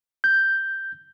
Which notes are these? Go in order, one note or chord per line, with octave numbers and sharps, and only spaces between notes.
G6